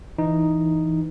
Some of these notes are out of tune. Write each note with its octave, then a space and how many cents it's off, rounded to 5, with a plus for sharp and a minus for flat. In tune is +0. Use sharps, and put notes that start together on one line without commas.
E3 +0 D#4 +0